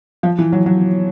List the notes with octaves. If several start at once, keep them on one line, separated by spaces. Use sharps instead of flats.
F3
E3
F#3
F#3